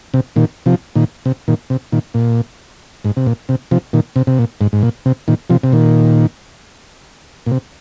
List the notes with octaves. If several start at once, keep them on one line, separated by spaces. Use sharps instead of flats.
C3
A#2 D#3
C3 F3
A#2 D#3
C3
A#2 D#3
C3
A#2 D#3
A#2
G#2
C3
A#2
C3
C3 F3
A#2 D#3
C3
C3
A#2
G#2
G#2
A#2
C3
A#2 D#3
C3 F3
C3
A#2 D#3
A#2
C3